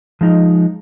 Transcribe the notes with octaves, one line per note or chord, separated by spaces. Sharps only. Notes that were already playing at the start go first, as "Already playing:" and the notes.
F3 G#3 D#4